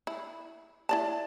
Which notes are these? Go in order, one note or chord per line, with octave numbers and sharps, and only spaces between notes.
E4
E4 D5 A5